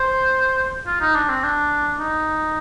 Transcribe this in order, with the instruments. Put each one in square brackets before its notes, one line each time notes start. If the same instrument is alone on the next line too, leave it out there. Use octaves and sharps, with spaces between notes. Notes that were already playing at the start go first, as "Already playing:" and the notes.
Already playing: [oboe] C5
F4
D#4
D4
C4
D4
D#4